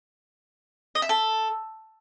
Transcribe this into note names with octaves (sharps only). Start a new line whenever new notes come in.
D#5
E5
A4